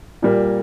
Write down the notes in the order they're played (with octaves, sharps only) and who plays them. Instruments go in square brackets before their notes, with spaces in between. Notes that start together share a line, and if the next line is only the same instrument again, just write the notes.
[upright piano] A#2 G3 A#3